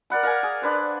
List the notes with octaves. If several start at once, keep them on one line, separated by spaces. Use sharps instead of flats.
A#4 D5 F#5 B5
A#4 F5 F#5 G#5
G#4
D4 B4 C5